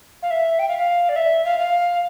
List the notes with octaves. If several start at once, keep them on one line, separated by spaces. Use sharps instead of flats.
F5
E5
G5
F5
F5
D5
E5
F5
F5